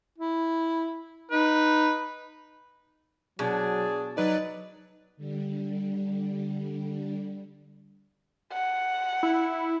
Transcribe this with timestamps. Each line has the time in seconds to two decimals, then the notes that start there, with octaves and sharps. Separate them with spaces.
0.18 E4
1.31 D#4 B4
3.39 B2 F#3 D4 G#4
4.17 F#3 D#4 B4 D5
5.17 D3 G3
8.53 F#5
9.23 E4